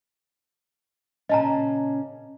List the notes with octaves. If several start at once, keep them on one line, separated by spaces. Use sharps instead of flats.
A#2 C#3 C#4 D#5 A5 A#5